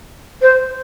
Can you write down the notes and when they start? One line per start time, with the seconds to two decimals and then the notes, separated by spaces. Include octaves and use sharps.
0.42 C5